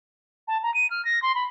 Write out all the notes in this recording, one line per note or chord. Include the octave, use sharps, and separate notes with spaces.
A5
A#5
D#7
F6
A#6
C6
B5